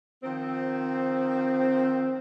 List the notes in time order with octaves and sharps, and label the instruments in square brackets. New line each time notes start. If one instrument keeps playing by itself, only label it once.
[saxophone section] D#3 F3 C4